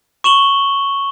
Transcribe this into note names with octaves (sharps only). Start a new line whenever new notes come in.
C#6 E7 F#7 G7